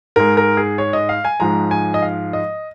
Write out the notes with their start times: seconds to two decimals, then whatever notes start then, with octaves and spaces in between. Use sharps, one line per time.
0.16 G#2 G#3 A#4
0.37 A#4
0.57 G#4
0.78 C#5
0.93 D#5
1.09 F5
1.25 G#5
1.40 G#2 F3 G#3 A#5
1.71 G#5
1.94 D#5
2.02 F5
2.33 D#5